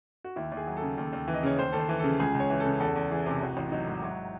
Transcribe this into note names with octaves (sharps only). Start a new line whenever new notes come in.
F#4
D#2 E4
D#2
G#4
F#3
A4
C#3
D#2
D#2
E3
D#5
C#3 C#5
D#2 C5
D#2 A4
C5
E3
C#3 A4
C#2 G#4
C#2
C#5
E3
A4
C#3
E2 A4
E2
E3 G#4
C3
A1 F#4
A1
F#3 D#4
G#2
F#3 E4